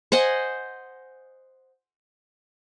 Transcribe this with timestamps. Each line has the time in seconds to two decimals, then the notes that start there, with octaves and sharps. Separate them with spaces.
0.12 C5 D#5 F#5 G#5